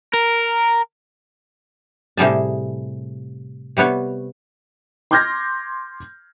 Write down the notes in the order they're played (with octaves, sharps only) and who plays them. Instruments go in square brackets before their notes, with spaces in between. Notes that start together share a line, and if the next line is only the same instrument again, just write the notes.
[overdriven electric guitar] A#4
[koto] A2 C3 G3 G#4 A5
C3 G3 B3 C#5
[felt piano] C6 D6 F6 G6 G#6 A#6